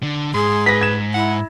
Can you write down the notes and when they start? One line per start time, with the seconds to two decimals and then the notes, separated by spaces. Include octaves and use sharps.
0.03 D3
0.34 G#2 G#4 C6
0.66 B4 A#6 B6
0.81 G#6 E7
1.14 E4 F#5